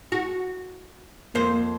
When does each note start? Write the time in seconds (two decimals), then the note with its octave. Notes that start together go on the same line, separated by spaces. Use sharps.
0.12 F#4
1.35 F2 A#3 C5